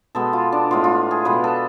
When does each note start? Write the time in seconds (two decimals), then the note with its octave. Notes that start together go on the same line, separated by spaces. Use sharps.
0.15 B2 G#3 B3 A4
0.33 F4
0.52 D4
0.71 A2 G#3 B3 F4
0.84 F4
1.11 G#4
1.25 B2 G#3 B3 B4
1.44 A4